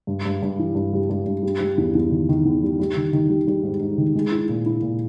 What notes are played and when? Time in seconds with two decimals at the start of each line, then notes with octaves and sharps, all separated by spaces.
0.07 G2
0.25 G2
0.42 G2
0.59 E3
0.75 G2
0.93 G3
1.10 G2
1.27 G2
1.43 G3
1.61 G3
1.78 E2
1.95 E2
2.11 D#3
2.29 D#3
2.45 E2
2.63 G3
2.80 G3
2.97 D#3
3.13 D#3
3.30 G3
3.48 G3
3.63 G#2
3.80 G#2
3.98 D#3
4.15 G#3
4.32 E4
4.49 A#2
4.66 E4
4.82 A#2